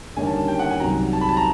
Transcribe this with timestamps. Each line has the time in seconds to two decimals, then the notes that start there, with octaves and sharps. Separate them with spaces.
0.16 D#2 D3 G3 A#3 C#4 G#5
0.27 A5
0.48 G5
0.59 F#5
0.70 G#5
0.80 C2 C3 D#3 F#3 A#5
1.13 A5
1.21 B5
1.29 A5
1.37 A#5